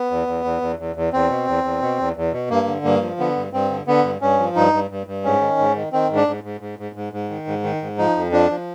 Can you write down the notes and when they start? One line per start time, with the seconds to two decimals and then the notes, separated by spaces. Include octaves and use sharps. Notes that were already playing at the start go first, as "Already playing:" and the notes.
Already playing: B3
0.11 E2
0.27 E2
0.44 E2
0.61 E2
0.79 E2
0.96 E2
1.13 E2 C4
1.30 B2
1.48 E2
1.64 E2
1.82 B2
1.99 E2
2.16 E2
2.33 B2
2.50 G2 A#3
2.67 D3
2.84 G2 A#3
3.01 F3
3.19 D3 B3
3.36 G2
3.53 G2 C4
3.70 D3
3.87 D3 B3
4.04 G2
4.21 G2 C#4
4.39 F3
4.56 G2 D#4
4.73 G2
4.90 G2
5.07 G2
5.24 G#2 C#4
5.41 D#3
5.59 G#2
5.76 D#3
5.93 D#3 C4
6.09 G#2
6.16 D4
6.27 G#2
6.44 G#2
6.61 G#2
6.79 G#2
6.95 G#2
7.13 G#2
7.30 D#3
7.47 G#2
7.64 D#3
7.82 G#2
7.98 F3 D#4
8.16 F2
8.32 F3 D4
8.50 F3